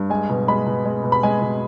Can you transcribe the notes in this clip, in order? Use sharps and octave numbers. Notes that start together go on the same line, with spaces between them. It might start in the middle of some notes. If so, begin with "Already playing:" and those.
Already playing: G2
G#3 G#5
B2
G#3 B5
B2
G#3
B2
B5
G#3 G#5
B2